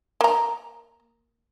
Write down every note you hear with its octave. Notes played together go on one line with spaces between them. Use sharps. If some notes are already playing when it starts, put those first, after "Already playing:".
A#3 A#5